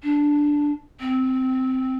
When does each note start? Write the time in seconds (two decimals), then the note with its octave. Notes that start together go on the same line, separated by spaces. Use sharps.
0.03 D4
1.01 C4